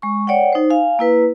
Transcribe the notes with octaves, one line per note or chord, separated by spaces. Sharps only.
G#3 C#6
C#5 D5 F#5 G5
D#4 C5
F5 G#5
A#3 E4 B4